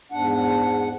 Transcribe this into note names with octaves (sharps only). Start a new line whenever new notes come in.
E2 G#2 D4 F#5